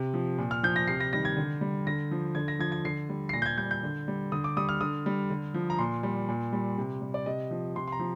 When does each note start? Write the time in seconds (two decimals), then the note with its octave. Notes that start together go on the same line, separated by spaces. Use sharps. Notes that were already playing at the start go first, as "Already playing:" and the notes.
Already playing: C3
0.14 F3
0.38 A#2
0.51 F6
0.63 F3 G6
0.76 A#6
0.88 C3 C7
1.00 A#6
1.13 D#3 G3 A#6
1.25 G#6
1.37 D3
1.61 G3
1.87 D3 A#6
2.11 F3
2.35 D3 G#6
2.48 A#6
2.59 F3 G#6
2.72 G#6
2.85 D3 C7
3.09 G3
3.29 C7
3.33 A#2 A#6
3.42 G6
3.46 G#6
3.58 G3 G6
3.71 G6
3.83 D3
4.08 G3
4.32 D3 D#6
4.44 D6
4.57 G3 D#6
4.69 F6
4.81 D3 D#6
5.06 G3
5.30 D3
5.54 F3
5.70 A#5
5.79 A#2 C6
6.03 G3
6.29 A#2
6.53 G3
6.78 C3
7.01 G3
7.14 D5
7.26 C3 D#5
7.51 F3
7.76 C3 C6
7.88 C6
7.92 A#5
7.99 F3